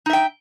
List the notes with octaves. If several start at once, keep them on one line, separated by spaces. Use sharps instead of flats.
D#4 E5 G5